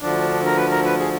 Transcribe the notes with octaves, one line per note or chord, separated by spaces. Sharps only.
D2 D3 F3 D4
A#4
B4
A#4
B4
G#4